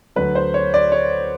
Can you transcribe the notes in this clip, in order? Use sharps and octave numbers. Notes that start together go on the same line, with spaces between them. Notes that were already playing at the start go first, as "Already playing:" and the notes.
D2 D3 F#3 B4
C5
C#5
D5
C#5